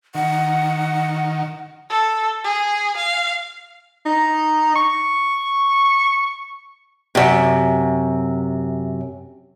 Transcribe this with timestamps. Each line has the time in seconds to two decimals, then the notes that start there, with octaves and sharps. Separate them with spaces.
0.15 D#3 F#5
1.90 A4
2.44 G#4
2.97 F5
4.06 D#4
4.76 C#6
7.15 F#2 C3